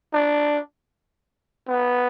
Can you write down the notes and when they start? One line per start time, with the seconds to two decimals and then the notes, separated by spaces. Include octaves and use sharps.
0.13 D4
1.68 B3